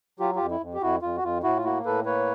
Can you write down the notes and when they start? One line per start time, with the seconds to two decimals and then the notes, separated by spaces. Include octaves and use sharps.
0.20 F#3 F4 G4
0.35 F2 F4 G4
0.51 E4
0.61 F2
0.74 G4
0.81 F2 E4 F#4
1.02 F2 F4
1.17 F#4
1.23 F2 F4
1.43 A2 E4 F#4
1.57 F4
1.64 A#3 E4 F#4
1.85 A2 A4 B4
2.06 A#3 B4 C#5